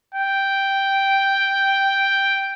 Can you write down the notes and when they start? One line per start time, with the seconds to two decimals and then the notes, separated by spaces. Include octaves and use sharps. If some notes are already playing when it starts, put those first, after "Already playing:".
0.15 G5